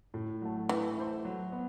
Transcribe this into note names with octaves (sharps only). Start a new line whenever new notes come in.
A2
F#3 A3
E3 A3
E4 A4 C5
F#3
B3